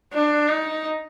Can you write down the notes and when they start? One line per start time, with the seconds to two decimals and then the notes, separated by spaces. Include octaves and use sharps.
0.13 D4
0.49 D#4